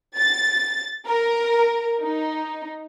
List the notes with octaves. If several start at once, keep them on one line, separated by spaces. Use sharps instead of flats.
A6
A#4
D#4